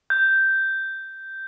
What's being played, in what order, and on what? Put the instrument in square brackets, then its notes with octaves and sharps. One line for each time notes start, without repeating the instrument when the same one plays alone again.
[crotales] G6